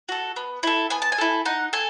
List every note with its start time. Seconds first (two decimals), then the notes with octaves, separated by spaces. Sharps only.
0.09 F#4 A4
0.36 B3
0.63 E4 A4
0.90 B3 G#5
1.02 A5
1.12 G#5
1.18 E4 A4
1.45 D#4 F#5
1.73 A4 G#5